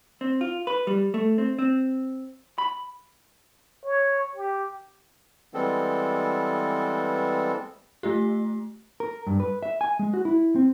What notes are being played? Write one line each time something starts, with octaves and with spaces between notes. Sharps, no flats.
C4
F4
B4
G3
A3
C4
C4
B5
C#5
G4
E3 G3 G#3 B3 C4 A4
A3 F4 G4
A#4
G2
B4
E5
G#5
G#3
F#4
E4
C4